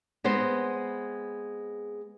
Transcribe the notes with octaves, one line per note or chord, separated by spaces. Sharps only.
G#3 B3 C4 C5